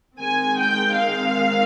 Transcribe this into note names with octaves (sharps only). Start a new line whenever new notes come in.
D#3 G#3 C4 G#5
G5
F5